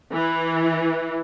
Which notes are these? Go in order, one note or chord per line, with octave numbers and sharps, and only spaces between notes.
E3